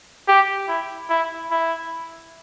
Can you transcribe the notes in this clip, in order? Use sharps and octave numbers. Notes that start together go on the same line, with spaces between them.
G4
E4
E4
E4